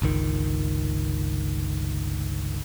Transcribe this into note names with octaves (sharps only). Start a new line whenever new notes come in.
G1 C#2 D#3